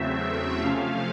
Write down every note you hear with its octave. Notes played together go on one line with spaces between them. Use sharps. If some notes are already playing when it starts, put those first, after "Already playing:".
Already playing: E2 C#3 F#3 A3 C4 E5
C3 F3 A3 C#4 F5